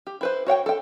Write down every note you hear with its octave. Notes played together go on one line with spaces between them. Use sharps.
G4
E4 B4 C5
F#4 C#5 F#5 G5
A4 G5